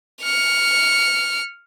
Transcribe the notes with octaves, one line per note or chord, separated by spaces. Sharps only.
F6 C#7